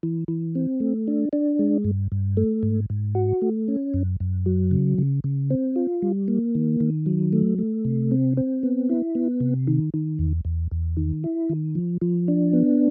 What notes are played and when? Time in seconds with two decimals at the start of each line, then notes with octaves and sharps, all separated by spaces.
0.03 E3
0.28 E3
0.55 C4
0.80 A3
1.07 D4
1.33 D4
1.59 G#3
1.84 G2
2.12 G2
2.37 A3
2.63 G#2
2.90 G#2
3.15 F#4
3.42 A3
3.68 C#4
3.94 F#2
4.20 F#2
4.46 F#3
4.71 C#3
4.98 C#3
5.24 C#3
5.51 C4
5.76 F4
6.02 G3
6.28 A#3
6.55 D#3
6.80 D#3
7.06 F#3
7.33 A3
7.58 A3
7.85 C3
8.11 C4
8.37 C4
8.63 B3
8.89 E4
9.15 B3
9.40 C3
9.67 D#3
9.94 D#3
10.19 E2
10.45 E2
10.71 E2
10.97 D#3
11.24 E4
11.49 D#3
11.75 F3
12.02 F3
12.28 D4
12.53 B3